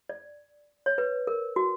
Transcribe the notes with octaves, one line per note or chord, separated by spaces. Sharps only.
D5
C#5
B4
A#4
F#4